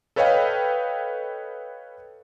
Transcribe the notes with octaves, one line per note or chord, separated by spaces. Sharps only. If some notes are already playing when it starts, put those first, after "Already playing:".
A4 B4 C#5 D#5 F5 G5